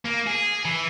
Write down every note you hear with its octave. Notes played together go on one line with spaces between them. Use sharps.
A#3
G#4
E3